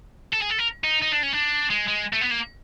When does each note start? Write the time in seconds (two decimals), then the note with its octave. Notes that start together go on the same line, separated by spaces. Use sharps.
0.33 A4
0.42 G#4
0.50 A4
0.59 A#4
0.84 D#4
1.02 D#4
1.12 D4
1.23 C#4
1.33 D4
1.70 G#3
1.87 G#3
2.13 A3
2.21 B3
2.31 A#3